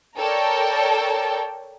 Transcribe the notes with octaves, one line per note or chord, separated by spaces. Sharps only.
A4 A#4 C#5 D5 G5